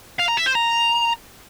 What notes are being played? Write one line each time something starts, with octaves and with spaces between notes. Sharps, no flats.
F5
A#5
E5
C5
A#5